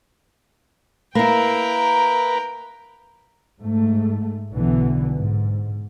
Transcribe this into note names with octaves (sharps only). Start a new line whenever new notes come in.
A#3 E4 A#4 B4 G5 A#5
G#2 A3
B1 D3 E3 B3
G#2